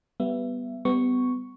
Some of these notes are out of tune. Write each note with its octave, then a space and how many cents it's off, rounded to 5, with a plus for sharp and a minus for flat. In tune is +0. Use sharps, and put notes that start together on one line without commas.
G3 -5 B3 +0 E5 +20
G3 +0 B3 +25 C#6 +0